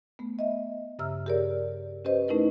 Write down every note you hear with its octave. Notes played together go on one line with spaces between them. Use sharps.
A3 B3
D#5 E5
G2 C#3 E5 A#5 E6 F6
G4 G#4 A#4 C#5 D5
C#4 G4 B4 C5 D#5
A3 C#4 D#4 E4 A#4 B4